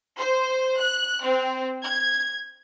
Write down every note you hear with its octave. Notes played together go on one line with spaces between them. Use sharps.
C5
F#6
C4
G#6